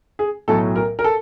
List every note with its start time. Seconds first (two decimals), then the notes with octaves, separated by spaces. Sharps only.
0.19 G#4
0.48 B1 A2 F#3 A4
0.76 A#4
0.99 A#4
1.04 A4